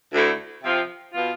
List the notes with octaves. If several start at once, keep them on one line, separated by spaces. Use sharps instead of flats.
D2 D3 A3 E4
C3 F3 C4 F4
B2 B3 F4